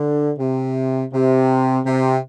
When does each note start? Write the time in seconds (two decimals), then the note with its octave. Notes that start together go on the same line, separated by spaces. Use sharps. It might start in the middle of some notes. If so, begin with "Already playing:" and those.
Already playing: D3
0.38 C3
1.12 C3
1.86 C3